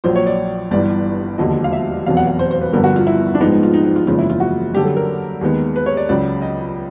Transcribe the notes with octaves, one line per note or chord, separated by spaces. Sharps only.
A#1 A#2 F#3 C5
C#5
D5
G1 G2 E3 D5
E1 D#2 D3 F3 D#5
F5
E5
F1 E2 B2 F#3 F5
F#5
F#5
C5
C5
B4
G1 F2 D3 G3 B3 A#4
F#4
F4
E4
D4
A#1 G#2 F3 G#3 B3 D#4
D#4
F4
D#4
D#4
F4
F#1 E2 C#3 F3 G#3 F4
E4
F4
F#4
G2 D3 F#3 G4
A4
A#4
D#2 D#3 G#3 B3
B4
C#5
D5
C#2 C#3 F#3 D5
D#5